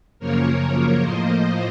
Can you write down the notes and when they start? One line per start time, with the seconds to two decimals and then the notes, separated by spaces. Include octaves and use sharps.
0.19 F#2 C#3 F3 A#3 A#4 C#5
1.01 A2 F3 A#3 C5 D#5